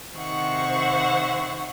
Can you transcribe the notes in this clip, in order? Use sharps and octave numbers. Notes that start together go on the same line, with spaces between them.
C3 D#3 C5 E5 F#5 C#6